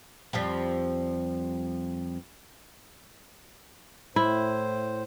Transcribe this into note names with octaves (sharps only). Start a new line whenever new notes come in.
F2 F3 G3
A2 E4 C5